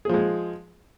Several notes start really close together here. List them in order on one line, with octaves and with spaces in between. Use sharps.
G#4 F3 G#3